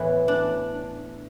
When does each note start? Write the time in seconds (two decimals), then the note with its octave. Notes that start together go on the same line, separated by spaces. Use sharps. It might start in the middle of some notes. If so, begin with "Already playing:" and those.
Already playing: A2 E3 B3
0.28 D4